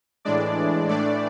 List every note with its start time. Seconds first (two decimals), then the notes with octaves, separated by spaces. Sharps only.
0.25 A2 E3 G#3 D4 D5
0.89 A2 E3 A3 D4 D5